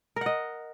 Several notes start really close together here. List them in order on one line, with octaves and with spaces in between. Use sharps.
A#4 F#5 D#5